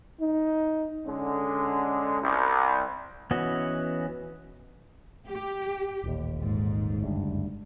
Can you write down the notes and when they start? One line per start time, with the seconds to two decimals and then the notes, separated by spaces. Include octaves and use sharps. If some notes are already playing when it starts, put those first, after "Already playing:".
0.21 D#4
1.06 D3 G#3 C#4
2.20 C2
3.31 E3 B3 C#4 F#4 D#5
5.27 G4
6.04 D#1 A1 D#2
6.42 G#2
7.00 F#1 D2 G2